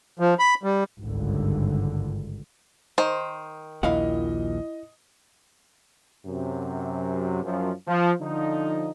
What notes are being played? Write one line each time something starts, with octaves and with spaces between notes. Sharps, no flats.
F3
B5
G3
G#1 C#2 G2 D3
D#3 C5
A#1 D#2 A#2 E4 D#5 F5 F#5
F#2 C3
F#2 F3
F3
D3 F3 D#4